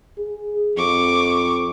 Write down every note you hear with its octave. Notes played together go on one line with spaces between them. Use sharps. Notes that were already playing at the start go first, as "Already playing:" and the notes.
G#4
F2 C#6 D6